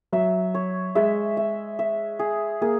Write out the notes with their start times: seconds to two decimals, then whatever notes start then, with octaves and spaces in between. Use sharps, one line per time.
0.13 F#3 E5
0.54 C#5
0.95 G#3 E5
1.37 E5
1.79 E5
2.19 G#4
2.61 A#3 G#4